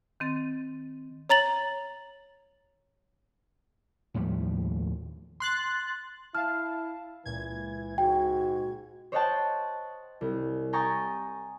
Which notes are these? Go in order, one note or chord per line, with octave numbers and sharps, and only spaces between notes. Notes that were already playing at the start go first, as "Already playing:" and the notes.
D#3 C4 A6
C#5 A#5 A6 F#7
D#2 A2 F3 G3
C6 F#6 A6
E4 F5 A5 F6
C#2 A#2 E3 G#6
G#2 F#4 G5
C5 C#5 D#5 F#5 G5 A5
C2
G5 G#5 A#5 C#6 D#6 A6